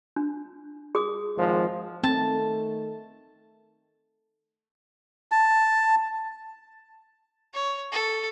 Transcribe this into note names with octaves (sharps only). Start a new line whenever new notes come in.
D4
G#4 D#6
G#1 F3 G#3
D#3 A3 C4 A4 A5
A5
C#5
A4